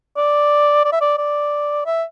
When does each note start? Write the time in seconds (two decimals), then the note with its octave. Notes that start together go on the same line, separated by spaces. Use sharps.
0.17 D5
0.85 D5
0.92 E5
1.01 D5
1.18 D5
1.86 E5